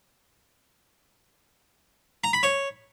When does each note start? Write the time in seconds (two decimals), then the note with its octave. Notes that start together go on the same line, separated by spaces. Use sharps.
2.24 A#5
2.33 B5
2.43 C#5